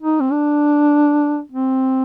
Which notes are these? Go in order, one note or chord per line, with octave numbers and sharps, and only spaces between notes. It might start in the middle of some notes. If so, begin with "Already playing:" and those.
D#4
C4
D4
C4